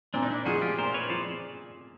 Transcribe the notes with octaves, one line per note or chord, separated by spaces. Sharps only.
A#2 C4 D4
D#4
D4 E4
F3 G#3 F#4 G#4
F4 G4
A#2 A#4 C5
B4 C#5
F3 C5 D5